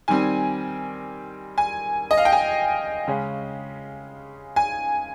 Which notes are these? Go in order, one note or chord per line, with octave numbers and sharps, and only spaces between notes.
D#3 G3 C4 G#5
G#5
D#5
F5
G5
G#5
C#3 G#3 C#4
G#5